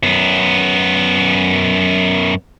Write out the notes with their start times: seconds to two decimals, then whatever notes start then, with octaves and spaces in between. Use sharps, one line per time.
0.03 F#2 B3